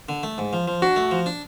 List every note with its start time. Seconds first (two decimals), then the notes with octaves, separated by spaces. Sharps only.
0.09 D3
0.23 A3
0.38 G#2
0.53 F3
0.68 F3
0.82 D4 F#4
0.96 A3
1.11 F3
1.26 D4